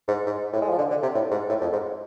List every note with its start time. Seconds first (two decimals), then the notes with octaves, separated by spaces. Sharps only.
0.08 G#2
0.26 G#2
0.53 A2
0.62 G#3
0.70 F3
0.78 D3
0.90 D3
1.03 C3
1.15 A2
1.31 G#2
1.49 A2
1.62 F2
1.73 G#2